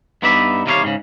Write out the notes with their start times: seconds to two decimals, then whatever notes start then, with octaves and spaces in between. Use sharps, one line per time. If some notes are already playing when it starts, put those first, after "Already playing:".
0.22 G2 B3 D#4 B4 D5 E5
0.66 D#2 C3 G3 A#4 C#5 F5
0.83 G#2 C#3